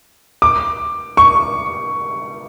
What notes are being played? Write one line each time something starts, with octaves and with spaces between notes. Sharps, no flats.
D6
C#6